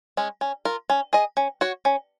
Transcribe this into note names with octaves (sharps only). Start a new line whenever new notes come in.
G#3 C#4
C#4
F4 A#4
C#4
G#4 D#5
C#4
F#4 C#5
C#4